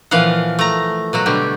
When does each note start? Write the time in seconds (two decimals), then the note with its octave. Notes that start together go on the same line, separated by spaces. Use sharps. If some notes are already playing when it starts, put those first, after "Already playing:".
0.11 A#2 E3 F3 F5 F#5
0.59 A3 A#5
1.13 B2 F#3 F#4
1.26 B2 D3 G3 G4